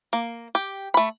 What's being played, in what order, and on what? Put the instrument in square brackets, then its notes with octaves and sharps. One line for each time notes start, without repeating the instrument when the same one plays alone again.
[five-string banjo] A#3
G4
A3 B5